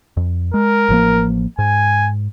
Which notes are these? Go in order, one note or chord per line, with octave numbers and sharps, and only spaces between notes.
F2
G#3 A#4
A1 F3 A#3
G#2 G#5